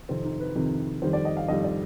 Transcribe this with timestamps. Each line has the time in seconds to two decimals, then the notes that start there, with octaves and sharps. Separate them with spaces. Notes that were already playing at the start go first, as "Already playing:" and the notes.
0.09 F2 C3 D#3 C4
0.24 D#4
0.40 B4
0.55 F2 C3 D#3
1.02 F2 D#3 G3 C5
1.13 D5
1.25 D#5
1.37 F5
1.48 F2 D#3 G3 D#5
1.64 D5